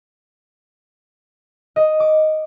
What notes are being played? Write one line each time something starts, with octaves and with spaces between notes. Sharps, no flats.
D#5
D6